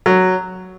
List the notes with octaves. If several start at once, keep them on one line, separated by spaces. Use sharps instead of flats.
F#3